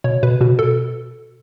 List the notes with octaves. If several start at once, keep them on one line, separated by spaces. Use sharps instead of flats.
B2 C#5
B2 B4
B2 F#4
B2 A4